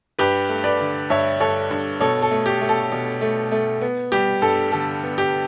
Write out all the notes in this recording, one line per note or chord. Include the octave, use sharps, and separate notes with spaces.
G2 G4 B4
A3
B4 D5
D3
G2 C#5 E5
G2 A4 C#5
G2
B2 A4 C#5
A4
A3
G4
A3
A4
B2
A3
A3
B3
G3 G4
G2 A4
D3 A4
B3
G4